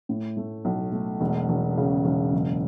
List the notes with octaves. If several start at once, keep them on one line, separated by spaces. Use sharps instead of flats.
A2
A3
B1
A3
E1
E1
C#3
E1
F#1